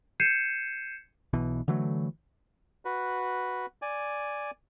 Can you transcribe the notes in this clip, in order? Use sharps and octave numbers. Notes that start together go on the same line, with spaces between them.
G6 G#6 C7 C#7 D#7 E7
B1 B2 E3
D3 E3 F#3 A3
F#4 B4
D5 G#5